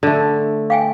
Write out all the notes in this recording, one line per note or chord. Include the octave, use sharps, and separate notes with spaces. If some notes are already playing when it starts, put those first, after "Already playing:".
D3 A3
F5 G5 G#5